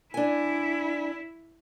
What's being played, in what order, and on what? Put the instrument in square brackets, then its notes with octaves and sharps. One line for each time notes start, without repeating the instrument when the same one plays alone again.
[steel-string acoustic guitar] D4 G#5 [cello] E4